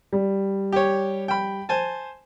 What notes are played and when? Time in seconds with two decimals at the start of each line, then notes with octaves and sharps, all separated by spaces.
0.13 G3
0.72 G4 C#5
1.28 G5 B5
1.69 C5 G#5 A5